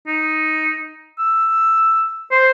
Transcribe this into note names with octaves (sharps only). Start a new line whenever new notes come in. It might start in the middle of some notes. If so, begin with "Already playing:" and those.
D#4
E6
C5